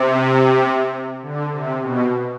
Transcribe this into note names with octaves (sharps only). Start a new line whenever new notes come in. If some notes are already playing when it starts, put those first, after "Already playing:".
Already playing: C3
D3
C3
B2